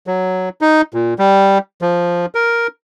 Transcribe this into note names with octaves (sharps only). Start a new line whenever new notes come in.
F#3
D#4
A#2
G3
F3
A#4